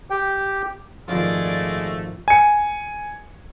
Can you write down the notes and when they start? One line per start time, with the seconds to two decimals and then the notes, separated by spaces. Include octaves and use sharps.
0.10 G4 G5
1.08 G#1 A#2 F3 G#3 A3 F4 D5
2.28 G#5 C#7